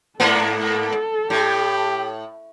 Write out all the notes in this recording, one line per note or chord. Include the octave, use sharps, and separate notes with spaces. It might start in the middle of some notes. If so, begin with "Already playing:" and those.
G#2 A#3 B3 A4
A2 G4